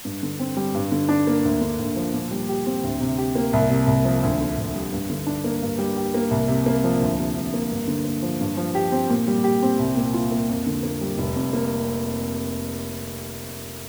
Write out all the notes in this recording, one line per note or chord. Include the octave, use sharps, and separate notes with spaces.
G2
D3
C4
G3
G2
D3
D4
A#3
D2
D3
D2
F3
A#2
G3
G4
C4
D2
C3
G4
A#3
C2
C3
C2
F3
D2
D3
D2
G3
G2
D3
D4
A#3
G2
G3
G4
A#3
C2
C3
A#3
F3
D2
C3
D2
A#3
G2
D3
A#3
F3
G2
F3
G4
C4
A#2
G3
G4
C4
C2
A#2
F4
A#3
F2
D3
A#3
G3
F1
F2
A#3